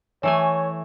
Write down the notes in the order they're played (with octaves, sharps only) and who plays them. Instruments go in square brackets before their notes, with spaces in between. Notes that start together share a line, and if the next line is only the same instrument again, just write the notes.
[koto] E3 A3 G#5 [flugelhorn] C#5